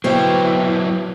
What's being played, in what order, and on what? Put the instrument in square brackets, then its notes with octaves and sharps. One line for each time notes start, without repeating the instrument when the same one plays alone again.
[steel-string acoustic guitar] B2 C4 G5 [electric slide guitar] F#3 E4